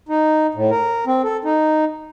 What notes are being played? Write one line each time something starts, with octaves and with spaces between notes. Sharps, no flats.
D#4
A2
A#4
C4
A4
D#4